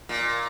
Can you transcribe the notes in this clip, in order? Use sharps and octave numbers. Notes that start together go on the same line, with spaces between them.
A#2